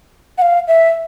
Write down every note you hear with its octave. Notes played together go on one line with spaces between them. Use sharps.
F#5
F5
E5